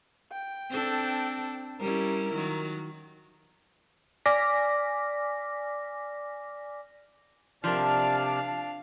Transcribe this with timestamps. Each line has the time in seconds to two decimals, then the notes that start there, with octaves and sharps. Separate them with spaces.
0.32 G5
0.70 C4 D4 A4
1.80 G3 C#4 E4 A#4
2.35 D#3 F#3
4.26 D5 G#5 D6 F6 A#6 B6
7.64 C3 F3 D4 A#4 D5 F5 A5 F6